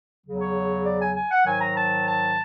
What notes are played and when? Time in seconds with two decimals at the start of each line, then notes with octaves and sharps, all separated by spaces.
0.24 E2 C#3 F#3
0.39 C#5
0.85 D5
1.00 G#5
1.16 G#5
1.31 F#5
1.46 G#2 D#3 F#3 G#5
1.61 A#5
1.77 A5
2.08 A5